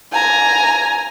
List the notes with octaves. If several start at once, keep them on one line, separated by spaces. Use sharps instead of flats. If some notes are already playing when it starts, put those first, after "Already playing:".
G#5 A#5